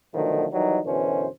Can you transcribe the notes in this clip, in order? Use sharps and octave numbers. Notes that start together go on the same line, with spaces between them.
B2 D3 D#3 F3 F#3 A3
D#3 E3 F#3 G3 D#4
F#2 B2 D3 E3 C#4 C5